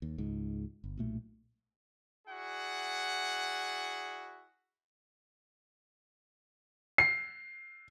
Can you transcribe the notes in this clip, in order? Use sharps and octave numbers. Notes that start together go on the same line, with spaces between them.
D#2
C#2 G#2
G1
B1 A#2 A3
E4 F#4 G#4 D5 F#5
C7